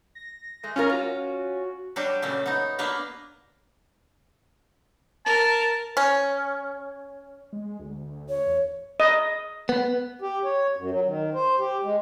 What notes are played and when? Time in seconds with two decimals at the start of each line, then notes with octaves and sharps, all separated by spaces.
0.15 A#6
0.64 G#3 A3
0.76 G#3 C#4 F4 A#4
0.90 F4 F#4
1.96 F#3 G3 D4 F#4 G4
2.22 A#2 C#3 F#3 A3
2.46 B3 D#4
2.78 A#3 B3 D4 B4 A#5
5.26 A#4 A5
5.97 C#4
7.53 G#3
7.79 D2
8.29 C#5
8.46 E2
9.00 D#5
9.69 B3
10.22 G4
10.44 C#5
10.77 F#2
10.91 F#3
11.05 D#3
11.34 C5
11.58 G4
11.84 G#3